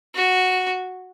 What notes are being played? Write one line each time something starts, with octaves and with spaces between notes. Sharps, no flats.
F#4